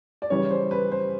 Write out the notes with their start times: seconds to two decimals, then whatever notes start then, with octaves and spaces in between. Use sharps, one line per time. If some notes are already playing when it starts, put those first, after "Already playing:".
0.22 D5
0.30 C#3 E3 G3 C#5
0.51 C5
0.71 B4
0.92 C5